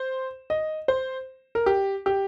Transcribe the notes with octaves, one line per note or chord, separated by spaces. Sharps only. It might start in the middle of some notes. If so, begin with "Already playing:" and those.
Already playing: C5
D#5
C5
A#4
G4
G4